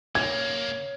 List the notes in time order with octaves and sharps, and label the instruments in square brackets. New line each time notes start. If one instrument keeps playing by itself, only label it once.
[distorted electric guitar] C#3 A#3 [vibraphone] C#5 [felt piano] G#6